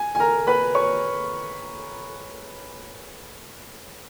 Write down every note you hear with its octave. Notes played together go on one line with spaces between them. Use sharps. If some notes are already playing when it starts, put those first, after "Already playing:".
Already playing: G#5
G#5
A#4 A#5
B4 B5
C#5 C#6